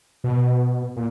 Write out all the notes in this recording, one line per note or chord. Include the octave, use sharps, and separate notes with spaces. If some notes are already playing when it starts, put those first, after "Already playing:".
B2
A#2